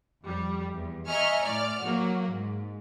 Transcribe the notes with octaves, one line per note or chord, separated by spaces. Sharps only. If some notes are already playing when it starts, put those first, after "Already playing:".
F2 G3
E2
D#5 E5 G#5 A#5 C#6 F6
A2 D5 F6
F#3 A#3 F#4
G#2